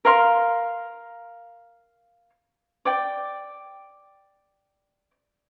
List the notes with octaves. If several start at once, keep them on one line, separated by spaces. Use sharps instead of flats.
A#4 F5 C6
D5 G5 D6